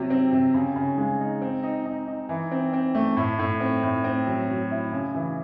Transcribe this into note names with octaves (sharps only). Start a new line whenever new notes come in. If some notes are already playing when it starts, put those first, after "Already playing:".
Already playing: C3 F#3
C4
C3
C#3
C#3
G#3
D#4
C4
D#4
D#4
D#4
E3
C4
C4
A3
A2
A2
C4
A2
C4
F#3
F#3
E4
C#3
E3